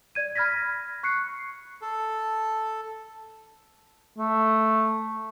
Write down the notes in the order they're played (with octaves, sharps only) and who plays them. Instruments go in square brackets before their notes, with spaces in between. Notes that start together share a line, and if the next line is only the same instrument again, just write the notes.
[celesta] D5 G#6 D#7
B5 F6 G#6 A#6 B6
C#6 F#6 C7 C#7
[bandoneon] A4
[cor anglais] A3